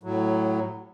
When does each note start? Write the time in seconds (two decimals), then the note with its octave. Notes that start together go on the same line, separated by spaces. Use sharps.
0.03 A2 F#3